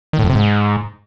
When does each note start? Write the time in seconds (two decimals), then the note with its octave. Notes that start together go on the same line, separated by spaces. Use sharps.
0.13 D#3
0.19 A2
0.24 F2
0.30 C3
0.35 G#2